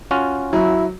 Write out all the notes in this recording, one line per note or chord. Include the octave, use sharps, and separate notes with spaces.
C#4 F4 F#4
F#3 E4